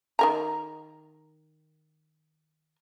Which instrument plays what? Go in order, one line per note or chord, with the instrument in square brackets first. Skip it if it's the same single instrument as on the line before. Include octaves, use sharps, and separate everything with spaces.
[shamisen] D#3 A#4 A#5